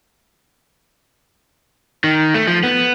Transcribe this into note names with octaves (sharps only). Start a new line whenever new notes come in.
D#3
A3
F3
B3